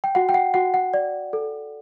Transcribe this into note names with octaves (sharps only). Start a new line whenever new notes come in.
G5
F#4 F#5
G5
F#5
F#4 F#5
F#5
D5
A4